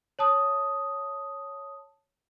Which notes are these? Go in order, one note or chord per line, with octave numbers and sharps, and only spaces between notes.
C#5 A5 D#6